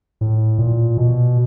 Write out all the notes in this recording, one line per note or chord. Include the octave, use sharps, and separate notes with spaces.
A2
A#2
B2